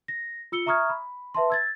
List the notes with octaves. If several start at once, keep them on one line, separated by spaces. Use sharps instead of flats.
A#6
F4 E6 C#7 G7
E5 A#5 C#6 D#6 F6 G#6
B5
B4 E5 A5 C6
E6 G#6 A6